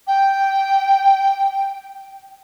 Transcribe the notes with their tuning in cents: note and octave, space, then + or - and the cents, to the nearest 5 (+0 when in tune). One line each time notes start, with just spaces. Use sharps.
G5 -5